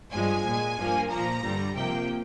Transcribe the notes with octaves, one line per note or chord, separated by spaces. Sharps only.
G2 F3 G#3 G#5
A#2 G#3
G2 F3 A#3
A#2 F3 A#3 A#5
G2 D3 G3
C3 F3 A#3 G5